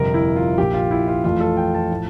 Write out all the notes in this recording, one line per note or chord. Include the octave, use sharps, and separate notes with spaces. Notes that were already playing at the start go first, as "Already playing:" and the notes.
Already playing: G1 F2 C3 F3 A#4
E4
F4
A#1 A#2 F3 G4
F4
E4
F4
F2 E3 A3 F4
A4
G5
A5
A2 F3